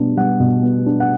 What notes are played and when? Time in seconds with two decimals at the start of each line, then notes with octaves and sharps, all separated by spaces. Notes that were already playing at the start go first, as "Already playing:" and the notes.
Already playing: B2 G3 B3 D4
0.16 G3 F#5
0.40 B2
0.63 B3
0.86 D4
1.00 F#5